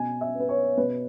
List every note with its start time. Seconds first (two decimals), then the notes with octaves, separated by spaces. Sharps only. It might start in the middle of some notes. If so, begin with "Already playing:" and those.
Already playing: B2 G#5
0.21 E5
0.35 B3
0.40 B4
0.49 C#5
0.77 B2 B4